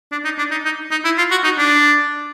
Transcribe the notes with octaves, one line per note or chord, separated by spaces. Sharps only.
D4
D#4
D4
D#4
D#4
D#4
E4
F4
F#4
D#4
D4